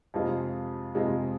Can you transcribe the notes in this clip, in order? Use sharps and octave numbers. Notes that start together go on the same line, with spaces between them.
F2 C3 G#3 F4
F2 C3 G#3 F4